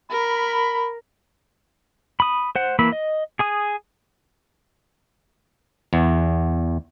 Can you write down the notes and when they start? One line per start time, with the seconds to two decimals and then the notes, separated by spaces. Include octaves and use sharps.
0.11 A#4 B5
2.20 B5 D#6
2.56 C5 F#5
2.79 E3 A#3 B5 E6
2.92 D#5
3.39 G#4 G#5 D#6
5.93 E2